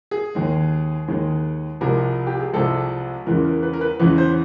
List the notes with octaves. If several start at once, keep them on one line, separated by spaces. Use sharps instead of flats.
G#4
D#2 D#3 G#3
D#2 D#3 G#3
C2 C3 F3 G#3 A#4
G4
G#4
C2 C3 F3 G#3 A4
E2 C#3 E3 G#3 A#4
A#4
B4
A#4
B4
E2 C#3 E3 G#3 B4
C5